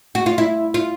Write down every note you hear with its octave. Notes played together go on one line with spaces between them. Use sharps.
F#4
F4
E4
F4